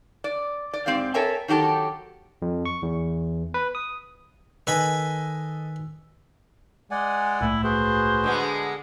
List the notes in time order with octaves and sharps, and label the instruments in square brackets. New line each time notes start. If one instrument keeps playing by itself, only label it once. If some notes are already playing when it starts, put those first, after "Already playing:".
[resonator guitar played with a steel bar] D5
D5
G#2 G3 C4 G4 D5 F5
A4 A#4 C#5 E5 G5 G#5
D#3 F#3 G4 A4
[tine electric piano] F2
C#6
E2
B4
D#6
[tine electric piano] D#3 E6 [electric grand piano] A4 D#5 [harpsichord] B4 G#5 B5
[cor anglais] G#3 [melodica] D5 F#5 G#5
[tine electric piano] C2 A2 A3 [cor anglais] E4
[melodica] F#4 G#4 B4 [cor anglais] C5
[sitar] D3 G#3 B3